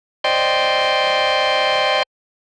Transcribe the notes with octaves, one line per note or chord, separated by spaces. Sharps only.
C5 D5 D#5 G5 C6